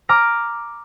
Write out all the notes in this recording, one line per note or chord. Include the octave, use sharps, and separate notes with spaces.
A#5 D6 F6 A#6